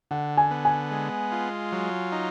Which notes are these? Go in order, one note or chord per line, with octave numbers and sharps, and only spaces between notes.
D3 F#5
G#5
B3
G#5
G#3
F4
F#3
D#4